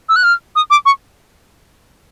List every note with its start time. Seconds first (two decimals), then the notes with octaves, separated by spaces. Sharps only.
0.09 E6
0.16 F#6
0.24 F6
0.56 D#6
0.70 D6
0.86 C#6